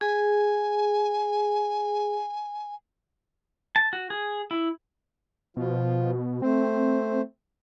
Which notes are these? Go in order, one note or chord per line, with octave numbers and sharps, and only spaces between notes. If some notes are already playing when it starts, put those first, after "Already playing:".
G#4 G#5
A5
F#4
G#4
E4
B2 F3 F4
A3 C4 C5